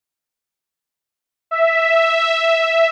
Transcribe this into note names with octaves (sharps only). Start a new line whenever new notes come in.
E5